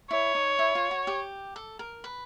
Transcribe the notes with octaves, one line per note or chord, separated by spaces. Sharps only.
E4 C#5
D#4
E4
F4
F#4
G4
A4
A#4
B4